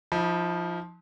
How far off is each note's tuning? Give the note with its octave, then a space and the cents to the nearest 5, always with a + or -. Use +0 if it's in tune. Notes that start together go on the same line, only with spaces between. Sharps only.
F3 +0 D#4 +40 B5 -35